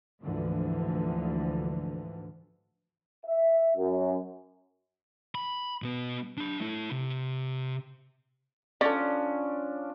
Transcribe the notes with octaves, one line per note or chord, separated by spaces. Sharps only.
D2 G#2 D3 E3 F3
E5
F#2
B5
B2 B3
D4 B5
A3 E4
C3
F3 C#4 D4 A4 D5